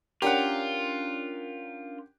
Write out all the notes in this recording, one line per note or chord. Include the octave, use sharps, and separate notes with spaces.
C#4 D4 F4 G4 A#4 F#5